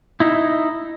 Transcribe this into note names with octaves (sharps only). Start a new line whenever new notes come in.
D#4 E4